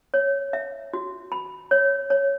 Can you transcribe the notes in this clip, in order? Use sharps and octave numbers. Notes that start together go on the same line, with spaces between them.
C#5
E5
F#4
B5
C#5
C#5